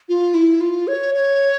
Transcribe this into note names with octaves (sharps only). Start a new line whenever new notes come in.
F4
E4
F4
C#5
C#5